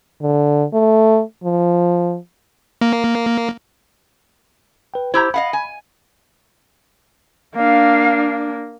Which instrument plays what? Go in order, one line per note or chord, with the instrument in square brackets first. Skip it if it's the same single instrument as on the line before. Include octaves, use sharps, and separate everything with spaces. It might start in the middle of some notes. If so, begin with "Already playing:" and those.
[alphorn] D3
A3
F3
[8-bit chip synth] A#3
[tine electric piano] B4 G5
[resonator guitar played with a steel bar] E4 G4 A#5 [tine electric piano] C5 E6 G6
[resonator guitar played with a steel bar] D#5 F5 F#5 [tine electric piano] B5
[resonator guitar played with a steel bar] G#5
[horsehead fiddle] A#3 D4 [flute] F5